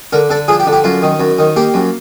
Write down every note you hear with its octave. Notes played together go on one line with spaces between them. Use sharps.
D3 A#4
D3 A4
F3 G#4
G4
D3
G4
F#2 F4
D#3
F#2
D#3
A#3 G4
F#2